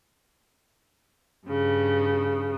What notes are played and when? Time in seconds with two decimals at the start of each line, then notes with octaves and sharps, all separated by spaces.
1.47 G2 C#3